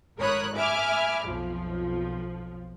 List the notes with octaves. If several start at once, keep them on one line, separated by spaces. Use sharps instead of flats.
G#1 A#4 C#5 B5 D#6 F#6
E5 G#5 B5 D6 F6
B1 F2 F3